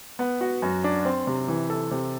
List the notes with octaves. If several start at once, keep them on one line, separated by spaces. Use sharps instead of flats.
B3
F#4
F#2
D4
C4
C3
E3
A4
C3